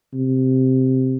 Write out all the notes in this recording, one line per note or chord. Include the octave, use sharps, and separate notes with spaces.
C3